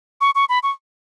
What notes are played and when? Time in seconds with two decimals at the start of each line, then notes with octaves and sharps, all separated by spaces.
0.21 C#6
0.35 C#6
0.49 B5
0.63 C#6